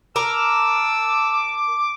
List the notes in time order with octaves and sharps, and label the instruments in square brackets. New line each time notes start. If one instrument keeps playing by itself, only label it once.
[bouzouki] A#4 [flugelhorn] A5 [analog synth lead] D6 [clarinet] E6